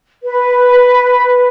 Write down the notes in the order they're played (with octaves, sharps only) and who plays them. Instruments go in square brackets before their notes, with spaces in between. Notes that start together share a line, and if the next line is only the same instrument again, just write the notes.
[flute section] B4